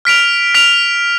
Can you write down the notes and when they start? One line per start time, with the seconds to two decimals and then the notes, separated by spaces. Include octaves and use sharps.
0.05 F6 B6 D7 F7
0.54 F6 B6 D7 F7